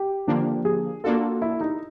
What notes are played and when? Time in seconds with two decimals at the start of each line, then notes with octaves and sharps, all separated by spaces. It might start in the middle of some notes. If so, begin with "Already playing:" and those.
Already playing: G4
0.27 D3 F3 A#3 D4
0.65 G#4
1.04 A#3 D4 F4 F#4 A4
1.42 E4
1.61 D#4